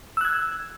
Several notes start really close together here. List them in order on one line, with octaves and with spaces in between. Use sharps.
E6 F#6 G#6